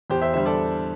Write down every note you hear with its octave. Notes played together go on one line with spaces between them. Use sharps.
E2 G4 C5
C5 E5
D3 G3 C5 E5
A4 D5